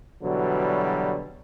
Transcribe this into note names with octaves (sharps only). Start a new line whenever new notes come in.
B2 D3 E3 F#3 G3